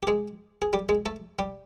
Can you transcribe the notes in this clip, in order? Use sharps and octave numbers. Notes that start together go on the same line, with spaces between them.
G4
G#3 G#4
G#4
G3 G4
G#3 G#4
A3 A4
G3 G4